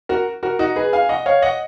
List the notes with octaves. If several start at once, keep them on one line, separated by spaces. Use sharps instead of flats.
F#4 A#4
F#4 A#4
D#4 F#4
G#4 B4
F5 G#5
D#5 F#5
C#5 F5
D#5 F#5